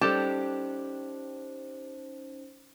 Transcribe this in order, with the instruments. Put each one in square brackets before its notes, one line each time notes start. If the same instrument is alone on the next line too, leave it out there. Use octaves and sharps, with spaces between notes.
[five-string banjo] G3 A4 A5 [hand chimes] C#4 D#4 C5 [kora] G4